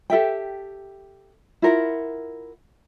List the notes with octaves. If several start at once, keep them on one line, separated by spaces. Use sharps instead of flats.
G4 A4 E5 G5
E4 F4 A#4 F#5